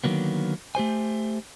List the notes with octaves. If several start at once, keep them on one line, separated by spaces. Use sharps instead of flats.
D3 D#3 F#3 A#3 B3
A3 G4 C5 G#5